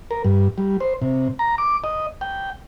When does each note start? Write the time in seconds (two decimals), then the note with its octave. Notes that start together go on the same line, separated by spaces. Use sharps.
0.11 A#4
0.24 G2
0.58 G3
0.80 C5
1.02 C3
1.39 A#5
1.58 D6
1.84 D#5
2.21 G5